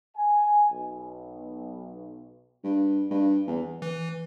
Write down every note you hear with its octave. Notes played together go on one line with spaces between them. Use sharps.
G#5
B1
G2
G2
E2
E3